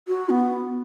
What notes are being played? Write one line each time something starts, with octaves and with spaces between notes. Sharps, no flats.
F#4
B3